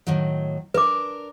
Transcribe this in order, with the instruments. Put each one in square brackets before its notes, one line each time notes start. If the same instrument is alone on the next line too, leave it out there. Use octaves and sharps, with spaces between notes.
[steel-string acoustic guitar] A2 D#3 F#3
[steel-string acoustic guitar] D4 A#4 [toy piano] B4 D6